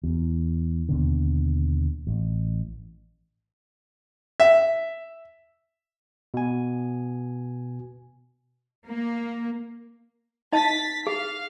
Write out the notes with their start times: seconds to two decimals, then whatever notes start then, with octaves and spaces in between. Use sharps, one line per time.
0.04 E2
0.89 D#2 B2 D3
2.07 A1
4.40 E5
6.34 B2 G#5
8.87 A#3
10.53 D#4 D#5 A5 A6 B6
11.07 G#4 F5